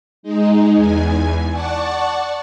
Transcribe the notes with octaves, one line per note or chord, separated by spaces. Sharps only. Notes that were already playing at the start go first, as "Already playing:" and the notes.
G#3 D#4
E2 G#5
D5 F#5 A5 C#6